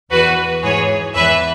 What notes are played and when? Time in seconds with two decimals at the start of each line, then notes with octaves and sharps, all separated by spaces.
0.11 E2 E3 F#4 B4
0.63 G#2 E3 G#4 C#5
1.15 E2 E3 B4 E5